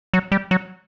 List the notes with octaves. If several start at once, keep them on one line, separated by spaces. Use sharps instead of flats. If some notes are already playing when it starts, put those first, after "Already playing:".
F#3
G3
F#3